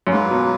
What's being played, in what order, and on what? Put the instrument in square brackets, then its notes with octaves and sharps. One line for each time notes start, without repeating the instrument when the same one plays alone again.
[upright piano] F#2
[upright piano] G#2 [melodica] F#3 A#3 F4 B4
[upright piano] B2